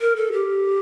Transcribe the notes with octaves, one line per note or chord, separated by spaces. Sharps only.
A#4
A4
G4